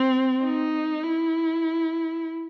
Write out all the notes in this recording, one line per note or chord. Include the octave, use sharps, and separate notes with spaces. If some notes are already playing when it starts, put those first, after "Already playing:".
Already playing: C4
D#4
E4